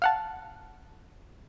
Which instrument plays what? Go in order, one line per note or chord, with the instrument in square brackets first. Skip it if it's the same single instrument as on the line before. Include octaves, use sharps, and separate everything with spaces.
[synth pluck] F5 F#5 A5